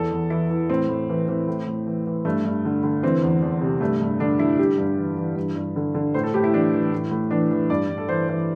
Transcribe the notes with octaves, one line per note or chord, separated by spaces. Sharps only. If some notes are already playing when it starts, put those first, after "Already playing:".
Already playing: E2 E3 A4
E2
E3 E4
E3
A2 C4
A2
E3
E3 C4
A2
A2
E3
E3
G2 A3
G2
D3
D3
E3 C4
E2
E2
C3
G2 A3
G2
D3 D4
D3 E4
G2 G4
G2
E3
E3
G2
G2
D3
D3
A2 C5
A4
A2 G4
E4
E3 D4
E3
A2
A2
E3 D4
E3
G2 D5
G2
A4
E3 C5
E3 C5